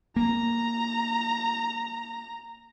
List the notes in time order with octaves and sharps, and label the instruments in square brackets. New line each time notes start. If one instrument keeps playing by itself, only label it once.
[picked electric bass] A#3 [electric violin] A#5